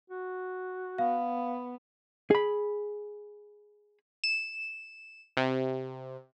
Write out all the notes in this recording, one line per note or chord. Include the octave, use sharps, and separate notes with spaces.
F#4
B3 F5
G#4 B5
E7
C3